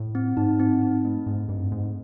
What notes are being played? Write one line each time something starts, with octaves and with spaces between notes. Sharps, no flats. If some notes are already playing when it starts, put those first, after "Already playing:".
Already playing: A2
C4
G#2 D#4
C4
D#4
A3
G#2 A3
G2 C4
G#2 A3